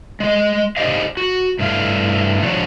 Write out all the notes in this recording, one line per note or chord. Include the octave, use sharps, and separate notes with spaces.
G#3 D#5
D#4 G4 C5 D5 D#5 F5
F#4
G2 A3 E4 F5
F3 F#3 G#3 D4 C#5 D5